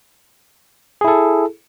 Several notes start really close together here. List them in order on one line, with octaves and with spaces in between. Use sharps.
G#4 E4 A4